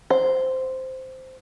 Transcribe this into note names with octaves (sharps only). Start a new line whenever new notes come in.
C5